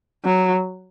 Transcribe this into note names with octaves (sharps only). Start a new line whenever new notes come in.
F#3